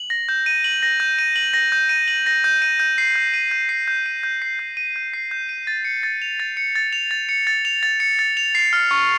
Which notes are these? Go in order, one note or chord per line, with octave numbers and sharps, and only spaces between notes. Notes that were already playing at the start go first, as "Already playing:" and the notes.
Already playing: F#7
A#6
G6
D#7
F#7
A#6
G6
D#7
F#7
A#6
G6
D#7
F#7
A#6
G6
D#7
G6
C7
G6
D#7
G6
C7
G6
D#7
G6
C7
G6
D#7
G6
C7
G6
D#7
A6
C#7
A6
F7
A6
C#7
A6
F7
A6
C#7
A6
F7
A6
C#7
A6
F7
C7
F6
C#6